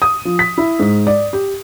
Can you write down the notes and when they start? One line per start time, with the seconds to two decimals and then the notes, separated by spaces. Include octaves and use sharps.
0.02 D#6
0.25 F3
0.39 B6
0.58 E4
0.79 G#2
1.07 D5
1.33 G4